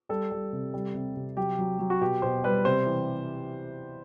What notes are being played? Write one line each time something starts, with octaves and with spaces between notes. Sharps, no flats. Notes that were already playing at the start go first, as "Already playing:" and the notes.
G3 A4
G3
C3
G3
C3
C3
F#3 G4
F#3
F#3
F#4
B2 G4
B2 C5
G3 B4
C3 C5
E3